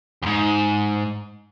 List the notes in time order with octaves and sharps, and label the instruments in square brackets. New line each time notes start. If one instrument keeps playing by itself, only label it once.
[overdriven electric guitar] E2 G#2